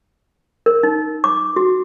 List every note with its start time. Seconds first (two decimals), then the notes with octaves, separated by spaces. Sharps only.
0.66 A#4
0.83 D#4
1.24 D6
1.56 F#4